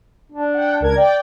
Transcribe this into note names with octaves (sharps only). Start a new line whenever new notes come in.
D4
F#5 G5
C#2 A#4 G#6
D5 G5